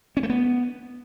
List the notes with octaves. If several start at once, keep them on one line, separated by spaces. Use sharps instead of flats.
C#4
A3
B3